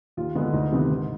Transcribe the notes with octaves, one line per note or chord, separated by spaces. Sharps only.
D#2 F4
D3 G#3 B3
D2 D#4
C3 D#3 B3
G#2